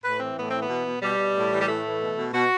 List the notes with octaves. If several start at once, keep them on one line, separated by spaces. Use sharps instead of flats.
A2 B4
E3 C4
A2 B3
E3 C4
B3
B2
B2
B2 G3
B2
A2
E3
G3
A2 A3
E3
B2
B2
B2 F#4